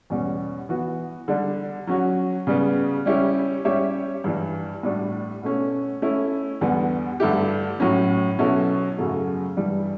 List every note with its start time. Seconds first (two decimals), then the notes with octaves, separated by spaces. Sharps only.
0.10 E2 B2 G3 C#4
0.69 E3 B3 F#4
1.28 D3 G3 D4
1.87 F#3 C#4 F#4
2.47 C#3 G3 B3
3.06 G3 C#4 E4 G4
3.65 G3 C#4 G4 C#5 E5
4.24 G2 E3 G3
4.83 A2 G3 D4 F#4
5.42 B2 A3 C#4
6.02 A3 C#4 E4
6.61 E2 D3 G3 B3
7.20 G2 D3 A3 E4 G4
7.80 A2 F#3 C#4
8.39 B2 F#3 C#4 E4 A4
8.98 F#2 C#3 F#3 A3
9.57 G2 E3 G3